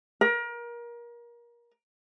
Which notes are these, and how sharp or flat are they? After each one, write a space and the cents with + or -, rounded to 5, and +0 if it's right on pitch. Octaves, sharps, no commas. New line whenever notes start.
A#4 +30